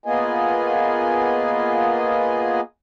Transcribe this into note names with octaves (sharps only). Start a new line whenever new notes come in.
A#3 B3 F4 G#4 D#5 G#5